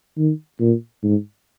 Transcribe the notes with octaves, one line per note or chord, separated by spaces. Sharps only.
D#3
A#2
G#2